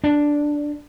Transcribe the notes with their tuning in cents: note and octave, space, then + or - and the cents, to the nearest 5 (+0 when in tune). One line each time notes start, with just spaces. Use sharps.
D4 +0